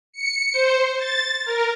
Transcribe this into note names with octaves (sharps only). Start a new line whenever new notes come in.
C#7
C5
A6
A#4